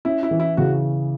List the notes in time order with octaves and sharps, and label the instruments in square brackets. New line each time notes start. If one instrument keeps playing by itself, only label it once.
[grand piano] C#4 [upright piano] E4
[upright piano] E4
[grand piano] E3
[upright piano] E4
[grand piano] C#3 [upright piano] F#4